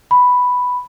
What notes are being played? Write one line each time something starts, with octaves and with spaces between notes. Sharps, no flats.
B5